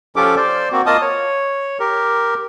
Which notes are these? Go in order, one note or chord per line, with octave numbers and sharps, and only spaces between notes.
F3 C#4 F4 G4 A4 D6
C5 D5
A#3 C4 F#4
A#3 F4 D#5 A5 D#6
C#5
G4 A#4